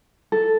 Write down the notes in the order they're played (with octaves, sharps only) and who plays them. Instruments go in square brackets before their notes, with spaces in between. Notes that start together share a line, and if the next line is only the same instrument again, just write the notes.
[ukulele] A4